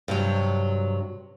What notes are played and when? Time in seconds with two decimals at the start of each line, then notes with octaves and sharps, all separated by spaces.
0.08 G2 C3 F#3